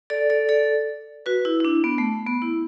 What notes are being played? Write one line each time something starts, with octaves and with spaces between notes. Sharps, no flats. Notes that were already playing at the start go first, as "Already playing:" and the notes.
A4 D5
A4 D5
A4 D5
F#4 B4
E4
E4
D4
B3
A3
B3
E4